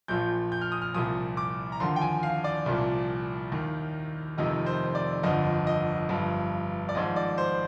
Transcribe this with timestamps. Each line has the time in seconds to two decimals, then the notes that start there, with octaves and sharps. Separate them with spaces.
0.08 A#1 A#2 F3 G6
0.52 G6
0.61 F6
0.72 D#6
0.82 F6
0.94 C2 A#2 F3 D#6
1.37 D6
1.72 A#5
1.80 D#2 D3 F3 C6
1.96 G5
2.01 G#5
2.23 F5
2.44 D5
2.66 C2 A#2 F3
3.52 D#2 D#3
4.37 F1 F2 C3 D#3 D#5
4.66 C5
4.86 C5
4.95 D5
5.23 G1 F2 D3 F3 D#5
5.67 D#5
6.09 G1 G2 F3
6.89 D5
6.95 G#1 G#2 F3 D#5
7.16 D5
7.38 C5